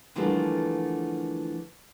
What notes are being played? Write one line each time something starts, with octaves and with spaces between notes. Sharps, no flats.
D3 E3 F3 G3 A3 A#3